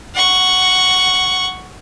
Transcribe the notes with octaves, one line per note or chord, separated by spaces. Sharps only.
F#5 C#6